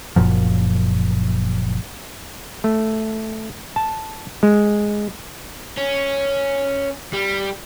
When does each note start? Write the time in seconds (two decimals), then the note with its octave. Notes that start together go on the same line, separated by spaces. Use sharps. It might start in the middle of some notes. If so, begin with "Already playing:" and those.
0.16 F#1 F#2 A#2 F3
2.64 A3
3.76 A5
4.43 G#3
5.78 C#4
7.13 G3